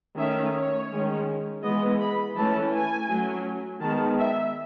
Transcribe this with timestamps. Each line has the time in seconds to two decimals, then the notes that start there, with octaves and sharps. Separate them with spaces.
0.18 D#3 A3 C#4 E5
0.55 C#5
0.91 D#3 G#3 C#4
1.64 E3 G#3 B3 D#5
2.00 B5
2.36 E3 A3 C#4 A5
2.74 G#5
3.10 F#3 A3 C#4
3.82 D#3 G#3 B3 A5
4.19 E5